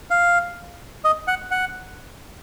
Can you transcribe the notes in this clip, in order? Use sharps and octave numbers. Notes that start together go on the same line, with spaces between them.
F5
D#5
F#5
F#5